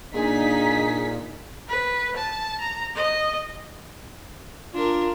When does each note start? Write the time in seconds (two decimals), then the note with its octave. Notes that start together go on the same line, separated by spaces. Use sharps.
0.14 A#2 D4 D#4 G#4 B6
1.69 B4
2.16 A5
2.61 A#5
2.95 D#5
4.74 D4 F4 A#4